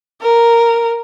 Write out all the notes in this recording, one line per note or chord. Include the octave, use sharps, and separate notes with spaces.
A#4